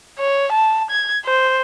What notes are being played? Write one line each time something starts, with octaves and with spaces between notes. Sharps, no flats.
C#5
A5
G#6
C5